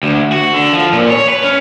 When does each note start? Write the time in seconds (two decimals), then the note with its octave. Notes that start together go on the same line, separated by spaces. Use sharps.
0.03 D2
0.32 F#4
0.53 D3
0.74 F3
0.93 A#2
1.09 C#5
1.28 B4
1.43 C#4